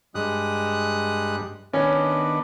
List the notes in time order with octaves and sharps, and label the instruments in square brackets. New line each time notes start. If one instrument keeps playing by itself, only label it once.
[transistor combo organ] G2 [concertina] G#3 D#6 F#6
[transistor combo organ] D#3 B3 D4 [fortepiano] C#4 [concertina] D#5